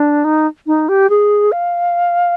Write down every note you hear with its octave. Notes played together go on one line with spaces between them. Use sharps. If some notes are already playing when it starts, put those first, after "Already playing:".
Already playing: D4
D#4
D#4
G4
G#4
F5